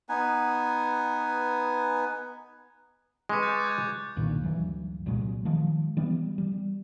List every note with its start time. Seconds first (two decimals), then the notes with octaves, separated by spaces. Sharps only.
0.09 B3 D#4 B4 G#5
3.29 G#3 B4 C#6 D6 C#7
3.43 F#6 G6 A6
3.59 D6 F#6 G#6
4.17 B1 G2 A#2 D#3
4.44 D2 G2 E3 F#3
5.06 C2 A#2 F#3 G#3
5.45 D#3 F3 G#3
5.97 E3 G3 B3
6.38 G3